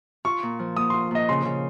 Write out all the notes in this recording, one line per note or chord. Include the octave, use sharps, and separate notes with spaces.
F4 C#6
A#2
F3
A#3 D#6
F4 C6
A#2 D#5
C#3 C6
C#3